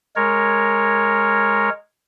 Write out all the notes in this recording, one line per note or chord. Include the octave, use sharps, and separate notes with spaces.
G#3 A#4 C#5